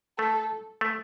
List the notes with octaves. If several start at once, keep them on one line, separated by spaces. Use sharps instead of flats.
A3 A4
A3